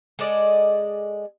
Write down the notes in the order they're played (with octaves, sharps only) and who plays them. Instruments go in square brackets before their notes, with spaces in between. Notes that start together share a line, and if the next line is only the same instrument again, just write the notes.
[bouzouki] G#3 A4 D5 D#5